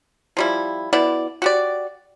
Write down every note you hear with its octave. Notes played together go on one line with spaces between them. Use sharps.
F3 G3 E4
B2 B3 E4 D5
F#4 G4 D5